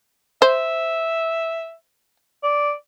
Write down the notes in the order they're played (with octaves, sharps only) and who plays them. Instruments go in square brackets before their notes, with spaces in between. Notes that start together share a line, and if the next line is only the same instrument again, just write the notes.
[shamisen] C5 [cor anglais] E5
[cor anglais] D5